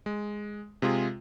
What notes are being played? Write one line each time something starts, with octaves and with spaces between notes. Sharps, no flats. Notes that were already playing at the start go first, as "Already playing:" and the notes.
G#3
C3 G#3 F4 G#4